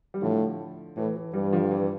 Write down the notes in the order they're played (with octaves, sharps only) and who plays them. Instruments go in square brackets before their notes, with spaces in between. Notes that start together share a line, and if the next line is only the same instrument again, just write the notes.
[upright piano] G3
[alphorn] A2 [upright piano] D3 F3
[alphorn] A2 [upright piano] E3
[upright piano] E3
[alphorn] G2 [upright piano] E3 G3
[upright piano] D3 F3
E3